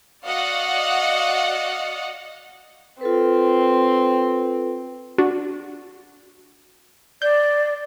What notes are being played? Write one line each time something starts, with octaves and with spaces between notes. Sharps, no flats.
F#4 D5 D#5 F5 F#5
C4 F4 A4 B4
D4 F#4
D5 G6